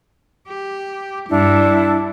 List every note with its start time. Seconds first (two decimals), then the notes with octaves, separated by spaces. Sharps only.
0.47 G4
1.30 G2 D4 E4